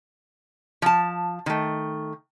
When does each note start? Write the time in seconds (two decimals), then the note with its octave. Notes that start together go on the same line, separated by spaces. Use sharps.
0.82 F3 A5
1.46 D#3 A3